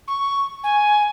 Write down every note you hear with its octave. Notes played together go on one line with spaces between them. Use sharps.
C#6
G#5